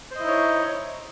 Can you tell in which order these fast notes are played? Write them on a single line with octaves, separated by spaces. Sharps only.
C5 D#5 E4 D#4 C#5